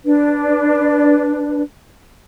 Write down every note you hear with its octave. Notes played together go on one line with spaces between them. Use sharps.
D4 B4